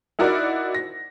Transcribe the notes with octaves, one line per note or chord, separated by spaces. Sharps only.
D#4 E4 F#4 A#4 D5
A#6